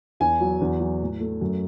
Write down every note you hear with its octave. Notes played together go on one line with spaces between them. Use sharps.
E2 G#5
F#3
E2
F#3
A2
A3
F#2